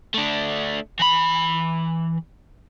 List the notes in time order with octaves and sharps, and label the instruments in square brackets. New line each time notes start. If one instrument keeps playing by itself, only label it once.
[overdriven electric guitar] A3 D4
E3 B5